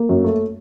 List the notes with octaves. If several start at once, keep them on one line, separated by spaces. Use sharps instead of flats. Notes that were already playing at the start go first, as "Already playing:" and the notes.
Already playing: A#3
F#2
A3